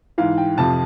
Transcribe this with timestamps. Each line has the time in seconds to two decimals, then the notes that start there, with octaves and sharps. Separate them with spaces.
0.18 G#2 E3 F5
0.38 G5
0.57 F2 C3 F3 A5